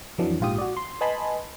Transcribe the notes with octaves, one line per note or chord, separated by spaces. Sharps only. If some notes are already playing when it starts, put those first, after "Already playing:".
F2 E3 F#3 D4
A#1 G#2 F4 G4 D#6
F#4 D5
C6
B4 D#5 G#5 A5 B5 C6